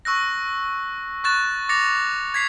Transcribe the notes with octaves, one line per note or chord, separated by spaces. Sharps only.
C#6 E6 F#6 A#6
C#6 F#6 A6 E7
D6 A6 A#6 C#7 F7
G#6 B6 C7 F7